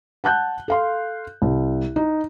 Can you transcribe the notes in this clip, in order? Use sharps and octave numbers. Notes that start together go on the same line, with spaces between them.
F#5 A5 F#6 G6
A4 F5 C6
C2
D#4